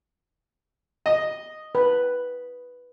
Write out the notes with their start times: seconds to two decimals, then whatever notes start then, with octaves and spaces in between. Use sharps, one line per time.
1.06 D#5
1.75 B4